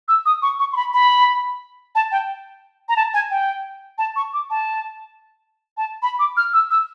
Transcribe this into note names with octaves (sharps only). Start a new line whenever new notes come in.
E6
D#6
C#6
C#6
C6
B5
B5
A5
G5
A#5
A5
G#5
G5
A5
C#6
D6
A5
A5
B5
D6
F6
E6
E6